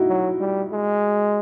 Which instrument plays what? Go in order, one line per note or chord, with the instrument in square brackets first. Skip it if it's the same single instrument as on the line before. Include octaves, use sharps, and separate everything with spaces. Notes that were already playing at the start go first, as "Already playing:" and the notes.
Already playing: [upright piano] D#4 E4 F#4
[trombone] F#3
G3
G#3